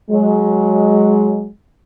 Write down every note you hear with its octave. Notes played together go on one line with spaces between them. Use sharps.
F#3 G#3